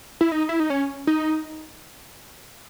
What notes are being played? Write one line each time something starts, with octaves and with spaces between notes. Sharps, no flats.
E4
D#4
E4
D#4
C#4
D#4